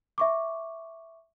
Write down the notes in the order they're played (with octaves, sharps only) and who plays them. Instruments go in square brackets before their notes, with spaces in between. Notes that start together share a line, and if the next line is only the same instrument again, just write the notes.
[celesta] E5 C#6 D6